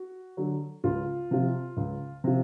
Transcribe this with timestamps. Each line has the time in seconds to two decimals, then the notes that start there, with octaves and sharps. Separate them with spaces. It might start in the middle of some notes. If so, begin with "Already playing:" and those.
Already playing: F#4
0.37 D3 F#3
0.84 C#2 F4
1.31 C3 F3
1.77 C#2
2.24 C3 F3